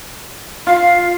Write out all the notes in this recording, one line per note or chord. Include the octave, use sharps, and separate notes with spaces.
F4 F5